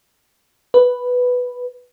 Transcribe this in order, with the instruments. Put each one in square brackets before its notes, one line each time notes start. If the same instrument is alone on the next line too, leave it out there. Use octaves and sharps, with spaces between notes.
[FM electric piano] B4